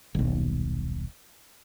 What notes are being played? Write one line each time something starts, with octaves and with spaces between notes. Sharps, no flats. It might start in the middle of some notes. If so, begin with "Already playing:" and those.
D#1 B1